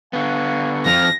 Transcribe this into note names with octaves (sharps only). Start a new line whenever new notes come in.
D3 B3 F5 G#5 C#6
F2 F3 F6 A#6